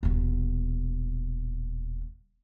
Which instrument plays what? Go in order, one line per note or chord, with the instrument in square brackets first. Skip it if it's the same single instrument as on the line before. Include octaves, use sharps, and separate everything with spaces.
[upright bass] D#1 B2